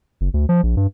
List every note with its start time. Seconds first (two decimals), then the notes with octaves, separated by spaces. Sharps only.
0.21 F#1
0.34 D2
0.49 F3
0.63 A#1
0.77 G2